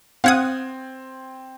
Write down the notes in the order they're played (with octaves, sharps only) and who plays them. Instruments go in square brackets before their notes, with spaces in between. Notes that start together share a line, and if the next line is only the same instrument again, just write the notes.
[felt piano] C4 G#6 [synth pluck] F5 F#5 D#6